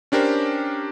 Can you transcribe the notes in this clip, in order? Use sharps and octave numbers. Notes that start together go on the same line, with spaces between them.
C#4 D4 G4 A#4 C5